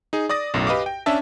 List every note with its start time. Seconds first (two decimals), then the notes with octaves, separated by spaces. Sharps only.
0.13 D#4 G#4
0.29 D5 D6 D#6 A#6
0.54 B1 F#2 A2
0.67 G4 B4 D#5 F5 D6
0.86 G5
1.06 C#4 D4 E5 A5